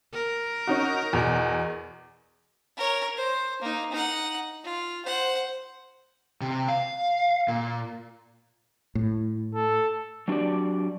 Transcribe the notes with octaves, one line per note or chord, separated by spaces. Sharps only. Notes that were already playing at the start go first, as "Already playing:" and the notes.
A#4
C#4 D#4 F#4
E2 B2
A#4 C#5
C5
A#3 D#4
D#4 F#5
F4
C5 F#5
C3
F5
A#2
A2
A4
F#3 D4 F#4 G4 D5